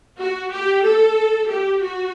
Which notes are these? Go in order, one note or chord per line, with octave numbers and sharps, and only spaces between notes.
F#4
G4
A4
G4
F#4